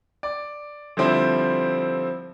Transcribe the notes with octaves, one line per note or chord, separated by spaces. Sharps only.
D5
D3 F3 G3 C4 E4